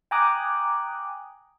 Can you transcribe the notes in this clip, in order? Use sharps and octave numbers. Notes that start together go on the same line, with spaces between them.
G5 G#5 A#5 D6 D#6 F#6